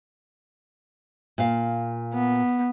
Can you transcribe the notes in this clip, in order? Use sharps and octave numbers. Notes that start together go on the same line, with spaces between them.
A#2 F5
B3